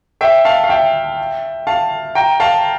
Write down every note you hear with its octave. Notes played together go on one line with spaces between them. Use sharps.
E5 G5
F5 A5
F5
E5 G5
F5 A5
G5 A#5
F5 A5